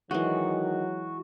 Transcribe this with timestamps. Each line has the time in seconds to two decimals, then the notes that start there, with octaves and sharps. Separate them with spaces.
0.11 D#3 E3 F#3 G#3 F#4